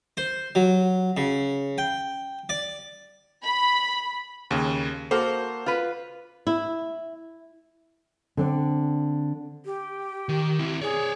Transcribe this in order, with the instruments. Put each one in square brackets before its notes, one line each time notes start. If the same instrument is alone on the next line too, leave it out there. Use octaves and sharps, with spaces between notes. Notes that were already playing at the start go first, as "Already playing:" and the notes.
[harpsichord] C5
F#3
C#3
G5
D5
[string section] B5
[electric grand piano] D#2 C#3
[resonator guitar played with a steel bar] A#3 F#4 A4 [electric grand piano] C5
[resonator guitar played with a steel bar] F4 B4
[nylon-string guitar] E4
D3 C4 D4
[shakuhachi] G4
[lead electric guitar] D#3
C4 E4
[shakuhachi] G#4 [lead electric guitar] C#5 D5